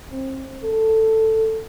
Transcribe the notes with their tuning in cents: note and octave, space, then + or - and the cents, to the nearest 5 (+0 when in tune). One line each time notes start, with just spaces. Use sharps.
C4 +30
A4 +10